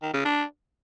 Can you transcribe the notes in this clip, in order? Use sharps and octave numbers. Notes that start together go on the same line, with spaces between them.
D#3
C#3
D4